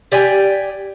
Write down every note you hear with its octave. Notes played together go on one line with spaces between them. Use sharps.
G4 D5 G5 G#5